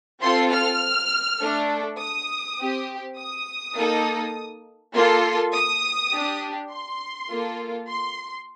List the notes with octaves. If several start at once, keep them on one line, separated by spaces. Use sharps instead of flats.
C4 F4 A4 C6
F6
A3 D4 A4
D#6
C4 G4
D#6
A#3 D#4 A4
A#3 F4 A4 C6
D#6
D4 G4
C6
A#3 F4 A4
C6